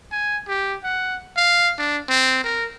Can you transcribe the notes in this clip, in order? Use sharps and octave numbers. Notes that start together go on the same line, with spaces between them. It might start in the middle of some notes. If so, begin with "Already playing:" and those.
G#5
G4
F#5
F5
D4
C4
A#4